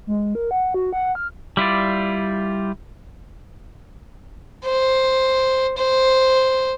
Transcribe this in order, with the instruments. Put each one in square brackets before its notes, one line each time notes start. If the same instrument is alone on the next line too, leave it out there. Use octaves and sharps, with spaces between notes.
[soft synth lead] G#3
A#4
F#5
F#4
F#5
F6
[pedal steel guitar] G3 E4 F4 D5
[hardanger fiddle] C5
C5